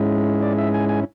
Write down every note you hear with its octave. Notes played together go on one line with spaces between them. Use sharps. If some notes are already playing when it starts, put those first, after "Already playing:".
Already playing: G#2 G#3 C#4 E4
D5
E5
G#5
G#5